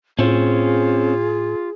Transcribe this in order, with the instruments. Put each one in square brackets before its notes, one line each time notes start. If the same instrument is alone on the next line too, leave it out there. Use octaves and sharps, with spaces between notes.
[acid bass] A2 [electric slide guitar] C4 C#4 [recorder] F4 [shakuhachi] G#4